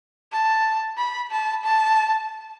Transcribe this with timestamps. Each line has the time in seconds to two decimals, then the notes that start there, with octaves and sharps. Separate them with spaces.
0.32 A5
0.98 B5
1.31 A5
1.64 A5